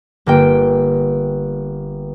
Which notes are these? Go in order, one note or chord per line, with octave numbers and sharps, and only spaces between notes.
G1 A#3 G5